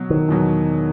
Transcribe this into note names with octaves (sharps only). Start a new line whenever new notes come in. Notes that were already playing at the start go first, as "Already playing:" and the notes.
Already playing: B2 F#3
D#3
E2 B2 F#3